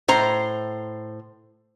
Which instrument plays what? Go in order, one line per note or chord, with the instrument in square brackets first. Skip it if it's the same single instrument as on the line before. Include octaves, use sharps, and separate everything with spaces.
[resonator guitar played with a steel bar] A2 C5 A#5